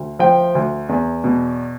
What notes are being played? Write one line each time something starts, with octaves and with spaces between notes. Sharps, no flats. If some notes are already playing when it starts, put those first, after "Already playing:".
Already playing: D2
F3 G5
D2
E2
B2